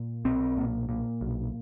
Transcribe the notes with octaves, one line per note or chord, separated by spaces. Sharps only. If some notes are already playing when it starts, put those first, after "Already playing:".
Already playing: A#2
B1 C4
A#2
A#2
B1